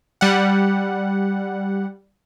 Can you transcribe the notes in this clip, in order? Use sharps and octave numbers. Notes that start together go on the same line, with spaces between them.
G3 F#5